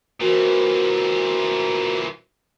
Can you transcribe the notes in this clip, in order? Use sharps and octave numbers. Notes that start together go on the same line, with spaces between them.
A#2 E3 F#4 A#4 C5